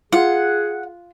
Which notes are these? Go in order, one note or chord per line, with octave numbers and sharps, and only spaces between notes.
F4 G#4 F#5